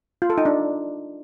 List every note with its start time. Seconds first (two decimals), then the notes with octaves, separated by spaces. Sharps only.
0.22 F4
0.30 A4
0.38 D#4
0.45 D4